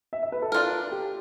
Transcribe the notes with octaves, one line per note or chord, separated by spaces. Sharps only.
E5
E5
B4
A4
D4 F4 A#4
G4